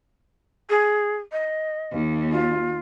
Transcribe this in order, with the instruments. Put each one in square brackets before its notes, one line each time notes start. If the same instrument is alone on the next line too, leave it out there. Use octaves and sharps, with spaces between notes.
[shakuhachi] G#4
D#5
[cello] D#2
[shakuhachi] F4